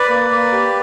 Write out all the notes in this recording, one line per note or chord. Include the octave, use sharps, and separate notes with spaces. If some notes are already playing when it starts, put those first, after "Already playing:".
Already playing: B4 D5
A#3
A#3
G4